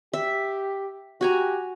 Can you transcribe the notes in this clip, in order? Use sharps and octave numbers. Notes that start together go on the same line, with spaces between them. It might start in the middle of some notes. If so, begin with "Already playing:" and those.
G4 E5
F#4 G4 G#5 A#5